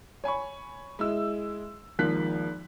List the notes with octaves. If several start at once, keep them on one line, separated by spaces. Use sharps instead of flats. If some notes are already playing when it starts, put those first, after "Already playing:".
C#5 G#5 B5 C#6
G#3 E4 E6
G#1 G#2 F3 A#3 F#6 B6